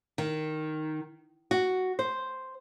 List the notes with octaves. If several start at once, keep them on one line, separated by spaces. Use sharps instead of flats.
D#3
F#4
C5